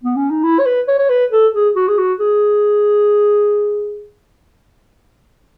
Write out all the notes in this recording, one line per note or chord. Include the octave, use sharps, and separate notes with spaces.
B3
C#4
D#4
E4
C#5
B4
C#5
C#5
B4
A4
G#4
F#4
G#4
F#4
G#4